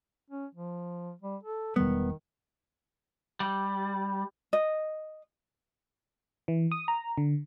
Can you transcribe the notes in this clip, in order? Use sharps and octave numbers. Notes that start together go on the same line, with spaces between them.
C#4
F3
G3
A4
E1 D#3 G3 B3
G3
D#5
E3
D#6
A#5
D3